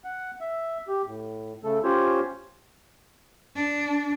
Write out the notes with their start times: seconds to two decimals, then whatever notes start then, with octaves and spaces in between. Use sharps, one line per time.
0.04 F#5
0.41 E5
0.88 G4
1.07 A2
1.64 C#3 A3 A4
1.84 C#4 F4 G4 C5 C#5
3.56 D4